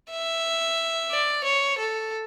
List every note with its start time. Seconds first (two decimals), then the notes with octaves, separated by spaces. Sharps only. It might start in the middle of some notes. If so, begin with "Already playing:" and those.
0.11 E5
1.11 D5
1.44 C#5
1.78 A4